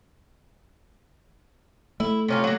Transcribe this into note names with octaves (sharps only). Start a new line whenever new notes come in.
A3 E4
C3 C#4 F4
F#3 A#3